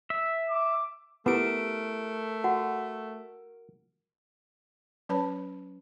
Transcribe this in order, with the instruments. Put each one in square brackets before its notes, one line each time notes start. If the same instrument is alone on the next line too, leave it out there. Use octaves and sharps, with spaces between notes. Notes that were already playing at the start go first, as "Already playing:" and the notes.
[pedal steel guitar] E5
[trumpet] D6
[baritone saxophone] A3 [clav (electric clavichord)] B3 [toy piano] E4 G4 D6 [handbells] A#4 D7
[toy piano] F#4 F#5
[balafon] F#3 C#4 B4 C#5 A5 B5